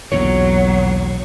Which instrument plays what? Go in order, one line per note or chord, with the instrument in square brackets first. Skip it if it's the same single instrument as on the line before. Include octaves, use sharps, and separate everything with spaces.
[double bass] B1 [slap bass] E2 A#2 D3 [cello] F#3 [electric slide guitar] C#5